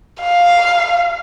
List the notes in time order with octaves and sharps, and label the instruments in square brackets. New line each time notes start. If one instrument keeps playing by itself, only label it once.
[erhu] F5